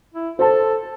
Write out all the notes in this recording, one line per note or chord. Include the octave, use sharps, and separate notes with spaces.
E4
A4 C5 A5